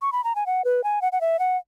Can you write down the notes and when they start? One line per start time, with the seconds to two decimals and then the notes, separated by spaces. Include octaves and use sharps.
0.02 C#6
0.12 B5
0.24 A#5
0.35 G#5
0.46 F#5
0.64 B4
0.84 G#5
1.02 F#5
1.12 F#5
1.21 E5
1.39 F#5